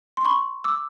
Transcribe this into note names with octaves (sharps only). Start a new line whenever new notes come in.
C6
B5 C#6
D6 E6